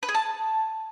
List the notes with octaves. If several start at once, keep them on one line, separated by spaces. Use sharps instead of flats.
B4
G#4
A5